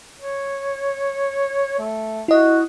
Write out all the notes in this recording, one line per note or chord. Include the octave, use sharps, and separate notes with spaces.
C#5
A3
E4 F#4 D#5